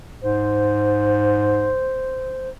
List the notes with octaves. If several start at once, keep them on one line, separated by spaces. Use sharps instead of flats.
G#2 C5